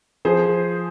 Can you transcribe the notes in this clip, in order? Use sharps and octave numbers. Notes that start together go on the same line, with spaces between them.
F3 G#4 C5